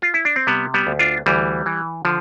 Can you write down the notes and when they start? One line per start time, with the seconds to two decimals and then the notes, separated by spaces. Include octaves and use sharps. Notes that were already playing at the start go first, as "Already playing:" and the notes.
0.02 F4
0.14 E4
0.25 D4
0.36 C4
0.47 C3 G3 B3
0.74 G3 B3
0.87 D2
0.99 D4 F4
1.26 D2 E3 G3
1.66 E3
2.05 D3 F3